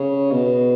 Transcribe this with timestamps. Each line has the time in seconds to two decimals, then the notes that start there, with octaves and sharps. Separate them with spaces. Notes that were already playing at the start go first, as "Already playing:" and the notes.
Already playing: C#3
0.31 B2